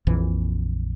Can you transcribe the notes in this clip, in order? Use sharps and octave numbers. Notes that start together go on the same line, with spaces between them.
A#1 F2 A#2 E3